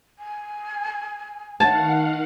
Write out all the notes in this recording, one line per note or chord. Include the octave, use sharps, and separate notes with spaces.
G#5
D#3 F5 F#5 A5